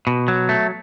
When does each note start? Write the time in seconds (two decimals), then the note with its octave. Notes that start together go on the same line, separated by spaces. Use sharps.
0.07 B2
0.28 F#3
0.49 A3